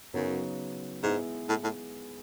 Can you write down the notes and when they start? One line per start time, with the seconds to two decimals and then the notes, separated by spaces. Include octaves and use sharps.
0.14 F#2 C#3 F#3 B3 D#4
1.03 G#2 G#3 B3 E4 B4
1.49 A2
1.64 A2